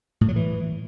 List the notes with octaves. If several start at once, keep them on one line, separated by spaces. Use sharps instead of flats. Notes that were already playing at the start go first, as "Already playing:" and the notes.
A2
F#3
E3